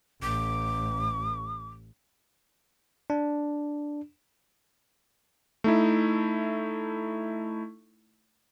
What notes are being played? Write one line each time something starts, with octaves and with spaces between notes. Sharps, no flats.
A1 D6
D4
A3 D#4 E4